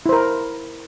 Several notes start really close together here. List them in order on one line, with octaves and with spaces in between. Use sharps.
E4 C5 A#4